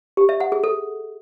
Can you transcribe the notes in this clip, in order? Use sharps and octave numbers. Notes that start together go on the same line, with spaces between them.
G4
E5
F#5
G#4
A4